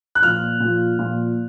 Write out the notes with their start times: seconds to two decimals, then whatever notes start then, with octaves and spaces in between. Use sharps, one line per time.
0.15 F#6
0.22 A#2 F3 F6
0.60 A#2 F3
0.99 A#2 F3